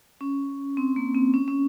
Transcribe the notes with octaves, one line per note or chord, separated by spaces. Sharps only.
C#4
C4
A#3
C4
C#4
C#4